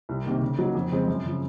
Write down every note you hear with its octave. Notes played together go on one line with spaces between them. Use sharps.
C2
C3 D#3 A#3
C#3
F#3 A#3 D#4
F2
C#3 F3 G#3 C4
F#2
C#3 F3